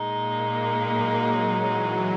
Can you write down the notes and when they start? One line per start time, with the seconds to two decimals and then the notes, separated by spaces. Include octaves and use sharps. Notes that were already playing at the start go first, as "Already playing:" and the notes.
Already playing: A#2 G#3 D#4
0.17 A#3
0.52 A#3
0.88 F#3
1.22 F#3
1.57 E3